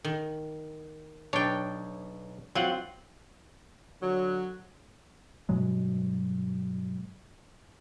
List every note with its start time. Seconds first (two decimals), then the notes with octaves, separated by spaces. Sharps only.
0.05 D#3
1.33 B1 D4 C#5 G5
2.55 F#3 C4 F4 F#5
4.02 D3 F#3
5.49 G2 B2 F#3 G#3